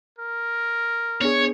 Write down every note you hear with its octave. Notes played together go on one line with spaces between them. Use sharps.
A#4
B3 D4 G#4 C#5